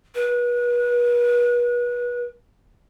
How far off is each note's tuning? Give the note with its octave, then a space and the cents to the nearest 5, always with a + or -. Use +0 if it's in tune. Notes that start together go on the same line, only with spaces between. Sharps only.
B4 -35